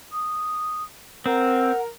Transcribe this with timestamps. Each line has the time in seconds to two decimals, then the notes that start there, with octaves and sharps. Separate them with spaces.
0.12 D#6
1.26 C4 A#4 F#5